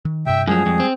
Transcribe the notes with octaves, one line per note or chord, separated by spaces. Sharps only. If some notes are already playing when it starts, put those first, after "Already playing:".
D#3
G2 C3 E5 G5
F#2 F3 G3 G#3 G#4
F2
C4